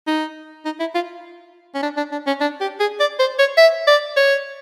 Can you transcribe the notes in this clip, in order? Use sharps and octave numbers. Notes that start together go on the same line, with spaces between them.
D#4
D#4
E4
F4
C#4
D4
D4
D4
C#4
D4
G4
G#4
D5
C5
C#5
E5
D5
C#5